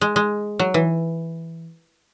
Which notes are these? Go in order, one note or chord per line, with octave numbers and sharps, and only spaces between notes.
G#3
G#3
F#3
E3